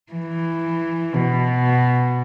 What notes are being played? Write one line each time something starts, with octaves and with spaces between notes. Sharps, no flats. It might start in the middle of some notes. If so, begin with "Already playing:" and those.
E3
B2